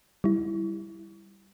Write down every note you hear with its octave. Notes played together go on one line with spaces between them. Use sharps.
G3 E4